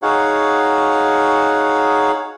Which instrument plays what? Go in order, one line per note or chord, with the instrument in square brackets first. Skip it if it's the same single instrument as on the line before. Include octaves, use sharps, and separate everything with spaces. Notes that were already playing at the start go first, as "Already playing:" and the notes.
[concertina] D#4 F#4 G#4 C#5 F5 F#5